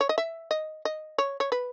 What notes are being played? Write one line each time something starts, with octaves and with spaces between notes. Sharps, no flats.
C#5
D#5
E5
D#5
D#5
C#5
C#5
B4